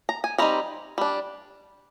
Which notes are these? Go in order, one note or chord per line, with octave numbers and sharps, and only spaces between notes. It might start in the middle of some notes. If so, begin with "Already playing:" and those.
A#5
G#5
G3 C4 D#4 A#5
G3 D4